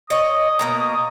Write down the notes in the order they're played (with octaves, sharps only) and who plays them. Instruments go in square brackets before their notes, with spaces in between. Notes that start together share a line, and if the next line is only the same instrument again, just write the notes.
[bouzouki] C#5 D#5 [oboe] D#6
[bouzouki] B2 A#3 A#5